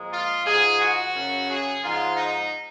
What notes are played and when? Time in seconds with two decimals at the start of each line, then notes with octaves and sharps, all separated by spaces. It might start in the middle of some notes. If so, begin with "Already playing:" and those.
Already playing: A#2 F3 G#3
0.12 F4
0.46 G#2 F3 G#3 G#4
0.81 F#4
1.15 F#2 C#3 F#3
1.49 G#4
1.83 G#2 F3 G#3 F4
2.17 D#4